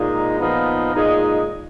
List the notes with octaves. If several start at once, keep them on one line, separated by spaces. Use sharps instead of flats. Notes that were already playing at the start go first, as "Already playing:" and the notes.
Already playing: A#2 G#3 D#4
A#2 F3 B3 D#4
A#2 G#3 D#4